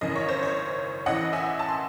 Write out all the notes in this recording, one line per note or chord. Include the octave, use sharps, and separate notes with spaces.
G#1 F#2 C#3 E3 D#5
C#5
C5
C#5
A1 A2 E3 D#5 F#5
E5 G#5
A5
C6